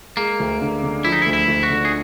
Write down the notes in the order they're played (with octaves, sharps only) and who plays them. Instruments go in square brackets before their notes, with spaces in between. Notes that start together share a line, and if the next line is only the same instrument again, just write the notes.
[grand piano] G#3 [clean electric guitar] A#3
[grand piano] D2
D3
D3
[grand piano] F3 [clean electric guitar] E4
[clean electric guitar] D#4
E4
[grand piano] D2
[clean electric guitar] E4
[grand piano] D2
[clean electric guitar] F#4
[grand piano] D3
[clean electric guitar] G#4